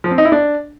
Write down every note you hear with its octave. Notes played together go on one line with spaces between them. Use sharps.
F3
C4
D#4
E4
D4